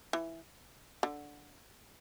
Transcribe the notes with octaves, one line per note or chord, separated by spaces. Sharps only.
E3
D3